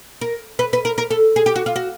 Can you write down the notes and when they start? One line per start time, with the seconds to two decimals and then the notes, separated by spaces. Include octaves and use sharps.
0.21 A#4
0.59 B4
0.73 B4
0.85 A#4
0.98 A#4
1.11 A4
1.36 G#4
1.46 G4
1.56 F#4
1.66 F4
1.76 F#4